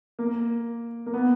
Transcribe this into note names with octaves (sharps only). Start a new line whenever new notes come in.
A#3
A#3
B3